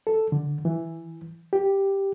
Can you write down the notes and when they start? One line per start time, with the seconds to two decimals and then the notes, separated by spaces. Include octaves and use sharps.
0.07 A4
0.32 D3
0.65 E3
1.53 G4